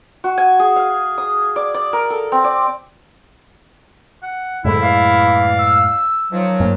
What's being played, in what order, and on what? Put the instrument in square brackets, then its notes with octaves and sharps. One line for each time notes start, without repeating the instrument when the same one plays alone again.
[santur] F#4
G#5
G#4
F5
D#6
D5
D5
A#4
A4
C4
D5
[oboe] F#5
[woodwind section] C2 D3 [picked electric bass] F#2 A2 G#3 [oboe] E4
[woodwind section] E3 D5 F5
[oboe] E6
[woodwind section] D#3 F3 F#3
[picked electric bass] G2 A#3